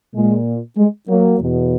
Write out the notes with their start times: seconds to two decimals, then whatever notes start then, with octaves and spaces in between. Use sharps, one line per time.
0.15 A#2 G#3
0.78 G#3
1.09 F#3 A#3
1.40 E2 B2